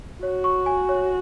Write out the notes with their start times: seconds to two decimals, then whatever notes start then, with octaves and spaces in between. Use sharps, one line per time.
0.22 F#4 C#5
0.44 C#6
0.66 G#5
0.89 C#5